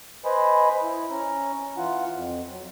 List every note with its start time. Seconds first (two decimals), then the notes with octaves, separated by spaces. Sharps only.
0.25 B4 C5 D#5 G#5 B5
0.83 E4
1.11 C#4 A#5
1.77 E3 F4 F#5
2.14 F2
2.50 F#3